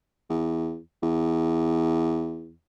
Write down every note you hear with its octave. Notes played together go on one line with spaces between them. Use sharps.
E2
E2